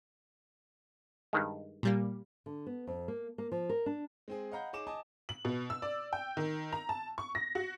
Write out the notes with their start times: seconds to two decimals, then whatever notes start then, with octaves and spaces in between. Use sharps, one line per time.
1.33 G2 D#3 G#3
1.83 A#2 G3 A#3
2.46 D3
2.66 B3
2.87 F2
3.08 A#3
3.38 A#3
3.52 F3
3.69 A#4
3.86 D4
4.28 G#3 C4 G#4
4.52 D#5 F5 F#5 A#5 B5 G6
4.73 D#4 G#4 C#5 D#5 D6 E7
4.87 D#5 G#5 A5 D6 D#6
5.29 F#7
5.45 B2
5.70 E6
5.82 D5
6.13 G5
6.37 D#3
6.72 A#5
6.89 A5
7.18 C#6
7.35 A#6
7.55 F#4